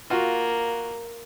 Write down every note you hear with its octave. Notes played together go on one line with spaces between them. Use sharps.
A#3 F4 F#4